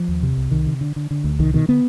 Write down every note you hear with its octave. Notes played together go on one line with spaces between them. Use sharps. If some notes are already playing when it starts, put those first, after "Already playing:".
Already playing: F3
D#2
C3
C2
C2 D#3
C3
D3
D3
D3
D2
C2 D#3
B2 D#3
D3 B3